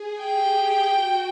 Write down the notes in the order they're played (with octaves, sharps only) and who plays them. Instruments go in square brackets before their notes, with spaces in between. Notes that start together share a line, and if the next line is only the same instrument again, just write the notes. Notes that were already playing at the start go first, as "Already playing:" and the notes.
Already playing: [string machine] G#4
[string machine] G4 [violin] G5
[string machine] F#4